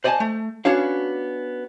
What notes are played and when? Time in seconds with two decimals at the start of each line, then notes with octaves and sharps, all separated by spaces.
0.04 C5 D5 D#5 F5 G#5 A5
0.20 A3
0.65 B3 C#4 D4 F#4 C#5 F5